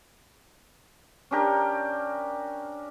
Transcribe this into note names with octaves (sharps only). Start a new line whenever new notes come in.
C#4 D4 G4 A#4